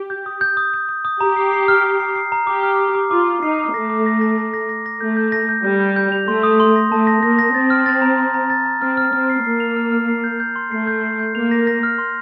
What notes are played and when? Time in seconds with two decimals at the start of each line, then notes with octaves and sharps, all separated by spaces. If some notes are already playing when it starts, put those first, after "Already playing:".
Already playing: G4
0.10 G6
0.26 D#6
0.41 G6
0.57 D#6
0.74 G6
0.89 D#6
1.05 D#6
1.21 G4 A#5
1.36 C7
1.53 C7
1.68 F6
1.84 F6
2.00 C7
2.15 C7
2.32 A#5
2.47 G4 D6
2.63 F6
2.79 D6
2.95 D6
3.11 F4 D6
3.27 D6
3.42 D#4 C7
3.59 D6
3.74 A3 A#6
3.90 D6
4.06 A#6
4.21 A#6
4.38 A#6
4.54 A#6
4.69 A#6
4.86 A#6
5.01 A3 G6
5.17 G6
5.32 A#6
5.49 G6
5.64 G3 G6
5.80 G6
5.96 G6
6.12 F7
6.28 A3 C6
6.43 D#6
6.60 C6
6.76 A#6
6.91 A3 A5
7.07 A#6
7.23 A#3 A#6
7.39 A#6
7.54 C4 A6
7.70 F6
7.86 A6
8.02 A#5
8.18 A#5
8.34 A#5
8.50 A6
8.66 A#5
8.81 C4 F6
8.97 F6
9.13 C4 F6
9.29 C7
9.44 A#3 C7
9.60 F7
9.77 F6
9.92 F6
10.08 C7
10.24 G6
10.40 G6
10.56 C6
10.71 A3 C7
10.87 G6
11.04 C7
11.19 G6
11.35 A#3 F7
11.51 A#6
11.67 A#6
11.83 F6
11.98 C6